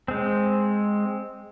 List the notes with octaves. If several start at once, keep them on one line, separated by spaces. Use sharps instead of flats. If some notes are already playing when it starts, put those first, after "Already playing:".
G#3 C4